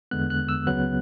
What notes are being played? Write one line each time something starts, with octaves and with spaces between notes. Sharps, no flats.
E2 D3 G#3 B3 F#6
F#6
E6
C#2 C#3 F#3 B3 F#6